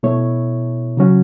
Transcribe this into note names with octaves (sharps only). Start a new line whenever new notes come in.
B2 A3 E4 C#5
C#3 F#3 C#4 F#4